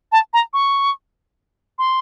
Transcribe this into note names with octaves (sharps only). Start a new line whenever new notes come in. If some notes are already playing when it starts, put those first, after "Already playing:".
A5
A#5
C#6
C6